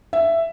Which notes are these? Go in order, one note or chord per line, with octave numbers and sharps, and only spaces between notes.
E5